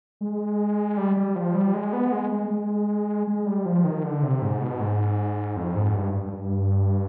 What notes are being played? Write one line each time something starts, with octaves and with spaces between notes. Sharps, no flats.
G#3
G3
G3
F3
G3
G#3
B3
G#3
G#3
G#3
G#3
G3
F3
D#3
D3
C3
G#2
B2
G#2
F2
G#2
G2
G2
G2